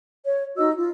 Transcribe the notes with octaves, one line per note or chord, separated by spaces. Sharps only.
C#5
D#4 F#4 D#5 E6
F4